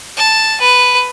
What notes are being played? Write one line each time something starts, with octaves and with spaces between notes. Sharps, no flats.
A5
B4